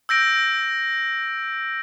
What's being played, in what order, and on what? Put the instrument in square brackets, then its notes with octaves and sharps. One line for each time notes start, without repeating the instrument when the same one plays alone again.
[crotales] E6 G6 A#6 D7